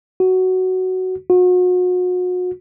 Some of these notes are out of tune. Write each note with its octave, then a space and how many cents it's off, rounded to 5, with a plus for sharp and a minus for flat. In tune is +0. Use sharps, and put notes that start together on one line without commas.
F#4 +10
F#4 -35